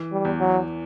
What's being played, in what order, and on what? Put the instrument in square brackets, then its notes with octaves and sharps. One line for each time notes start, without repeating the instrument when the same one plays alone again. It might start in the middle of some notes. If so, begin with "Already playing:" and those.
Already playing: [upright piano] E3
[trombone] G3
[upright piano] E2
[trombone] F#3